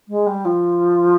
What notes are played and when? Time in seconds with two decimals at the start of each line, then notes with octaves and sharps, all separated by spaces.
0.08 G#3
0.26 G3
0.45 F3